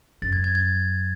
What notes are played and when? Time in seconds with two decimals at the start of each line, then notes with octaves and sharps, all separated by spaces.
0.22 F#2 A6
0.33 G#6
0.44 G#6
0.55 G#6